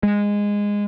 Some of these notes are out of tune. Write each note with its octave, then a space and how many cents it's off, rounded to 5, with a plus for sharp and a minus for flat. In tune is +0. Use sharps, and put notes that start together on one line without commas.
G#3 -15